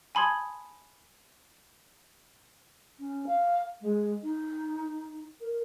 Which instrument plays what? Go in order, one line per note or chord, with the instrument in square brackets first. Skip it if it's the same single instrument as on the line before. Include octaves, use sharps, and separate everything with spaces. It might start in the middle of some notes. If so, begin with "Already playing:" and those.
[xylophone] G#5 A5 B5 C6 D#6 G#6
[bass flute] C#4
F5
G#3
D#4
A#4